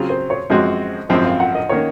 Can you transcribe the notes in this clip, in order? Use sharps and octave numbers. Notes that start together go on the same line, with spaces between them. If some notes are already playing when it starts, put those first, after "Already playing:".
Already playing: C#3 F#3 C4 F4 G#4
C5
C#5
F#2 F3 G#3 C4 F#4 D#5
G#1 F#2 F3 C4 D#5
F5
F#5
D#5
D#3 A#3 C#4 C#5